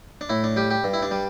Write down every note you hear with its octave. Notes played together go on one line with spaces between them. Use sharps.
D4
A2 E4
D4
G3 G4
G4
G2
E4
D4
G3